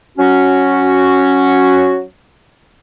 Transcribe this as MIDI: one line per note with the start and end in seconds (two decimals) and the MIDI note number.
0.18 2.03 54
0.18 2.03 61
0.18 2.03 66